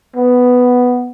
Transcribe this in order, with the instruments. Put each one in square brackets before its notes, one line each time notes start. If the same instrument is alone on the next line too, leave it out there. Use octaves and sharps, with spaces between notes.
[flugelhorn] B3